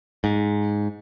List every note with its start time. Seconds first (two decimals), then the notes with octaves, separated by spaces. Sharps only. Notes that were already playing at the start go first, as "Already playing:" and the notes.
0.24 G#2